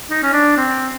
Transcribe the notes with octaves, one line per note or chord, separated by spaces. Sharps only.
D#4
C#4
D4
C4